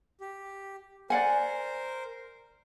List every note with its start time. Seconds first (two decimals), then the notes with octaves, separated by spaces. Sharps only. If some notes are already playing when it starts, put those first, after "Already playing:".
0.21 G4
1.10 A#4 C5 D5 F#5 G#5